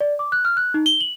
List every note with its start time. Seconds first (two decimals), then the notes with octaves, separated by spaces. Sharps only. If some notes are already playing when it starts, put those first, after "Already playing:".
0.01 D5
0.19 D6
0.32 F#6
0.45 F6
0.57 F#6
0.74 D#4
0.86 G7
1.01 F#7